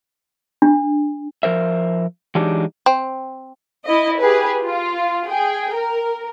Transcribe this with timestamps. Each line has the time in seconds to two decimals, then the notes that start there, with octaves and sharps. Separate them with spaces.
0.62 D4
1.43 F3 A#4 C5 E5
2.35 E3 F#3 G#3 D4 D#4 G4
2.86 C4
3.85 E4 D#5
4.19 G4 G#4 B4
4.64 F4
5.28 G#4 G5
5.73 A#4